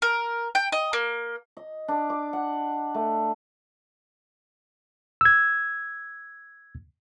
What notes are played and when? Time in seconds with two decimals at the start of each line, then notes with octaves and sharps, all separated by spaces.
0.02 A#4
0.55 G5
0.72 D#5
0.93 A#3
1.57 D#5
1.88 D4
2.10 D6
2.33 F#5
2.94 A3
5.21 E6 G#6